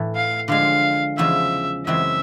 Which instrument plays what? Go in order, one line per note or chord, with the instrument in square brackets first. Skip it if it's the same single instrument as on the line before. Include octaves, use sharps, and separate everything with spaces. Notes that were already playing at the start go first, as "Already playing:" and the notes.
Already playing: [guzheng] A2 E3 A3
[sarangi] F5
[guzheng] D3 F3 G#3 [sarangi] F5
[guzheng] E2 C#3 F3 G#3 [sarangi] E5
[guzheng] F#2 C#3 E3 G#3 C4 [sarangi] E5